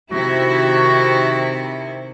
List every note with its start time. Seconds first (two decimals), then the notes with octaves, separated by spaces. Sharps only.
0.11 C3 D#3 E4 F#4